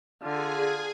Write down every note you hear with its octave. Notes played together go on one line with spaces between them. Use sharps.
D3 F4 G#4 G#5